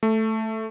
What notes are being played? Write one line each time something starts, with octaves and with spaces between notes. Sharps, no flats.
A3